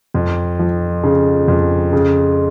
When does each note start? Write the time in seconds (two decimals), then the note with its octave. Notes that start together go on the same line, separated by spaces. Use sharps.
0.14 F2
0.59 F3
1.03 C#3
1.48 F2
1.93 C#3